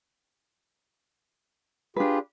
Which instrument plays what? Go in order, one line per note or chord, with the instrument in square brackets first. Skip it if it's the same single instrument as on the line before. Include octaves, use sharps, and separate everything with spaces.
[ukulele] D4 B4 [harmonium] F4 G4 G#4